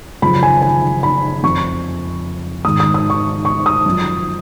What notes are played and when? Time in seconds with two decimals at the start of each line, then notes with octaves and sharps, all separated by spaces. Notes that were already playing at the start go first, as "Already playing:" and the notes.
0.22 F#2 C#3 F3 B5
0.43 G#5
0.62 G#5
1.03 B5
1.43 F2 F3 C#6
2.64 G#2 D#3 D#6
2.80 D#6
2.94 D#6
3.10 C#6
3.45 C#6
3.66 D#6
3.86 F#2 F3